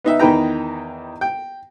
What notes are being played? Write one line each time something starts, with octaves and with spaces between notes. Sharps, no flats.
B3 D#4 E5
E2 D#3 D#4 B4 G5 A#5
G5